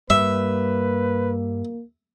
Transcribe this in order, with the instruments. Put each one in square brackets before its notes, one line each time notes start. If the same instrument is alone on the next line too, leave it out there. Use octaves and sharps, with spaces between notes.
[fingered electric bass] G2 G3 [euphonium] A#3 [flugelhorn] B4 [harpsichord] E5